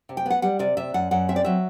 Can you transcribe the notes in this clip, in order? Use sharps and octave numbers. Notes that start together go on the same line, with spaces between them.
C3
G5
B3 F#5
G3 F#5
C3 D5
C3 E5
F#2 F#5
F#2 F#5
C4 E5
D5
F#3 E5